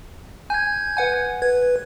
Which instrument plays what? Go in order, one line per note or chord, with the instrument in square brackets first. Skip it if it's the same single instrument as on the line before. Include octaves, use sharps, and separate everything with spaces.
[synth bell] G#5 [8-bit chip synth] G6 G#6
[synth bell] B4 F#5 G#5
[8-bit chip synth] B4 [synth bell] G#6